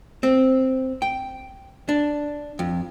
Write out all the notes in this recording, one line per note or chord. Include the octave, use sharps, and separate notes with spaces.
C4
G5
D4
F2